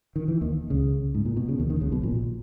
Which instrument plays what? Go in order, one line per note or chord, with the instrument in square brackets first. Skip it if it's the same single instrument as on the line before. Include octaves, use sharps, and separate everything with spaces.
[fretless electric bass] D#3
E3
D#2 D#3
C#2 C#3
G#2
A#2
B2
C#3
D#2 D#3
D#2 D#3
C#2 C#3
B1 B2
A#1 A#2